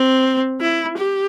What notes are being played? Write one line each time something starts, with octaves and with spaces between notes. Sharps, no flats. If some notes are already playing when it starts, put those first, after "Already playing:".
Already playing: C4
E4
G4